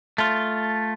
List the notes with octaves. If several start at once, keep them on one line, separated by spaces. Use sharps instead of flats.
A3 F4